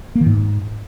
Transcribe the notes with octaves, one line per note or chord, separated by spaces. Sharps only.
A#3
D#3
G#2